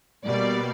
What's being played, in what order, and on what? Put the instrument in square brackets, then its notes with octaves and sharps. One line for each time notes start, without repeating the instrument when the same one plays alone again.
[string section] B2 G3 A#3 D5